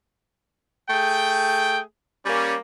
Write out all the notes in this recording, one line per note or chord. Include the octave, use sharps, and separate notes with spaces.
A3 G#4 G5
G3 A#3 C#4